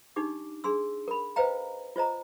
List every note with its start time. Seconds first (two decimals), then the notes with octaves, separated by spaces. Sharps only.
0.16 D4 D#4 G4 D6
0.64 D4 G#4 C6 E6
1.08 A#4 B5
1.36 B4 C5 D#5 F5 G5 A#5
1.96 F4 C5 D#5 A#5